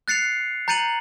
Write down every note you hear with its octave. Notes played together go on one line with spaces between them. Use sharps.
F#6 A6 C7 C#7 F7
A#5 G6 A6 C#7 D#7 F#7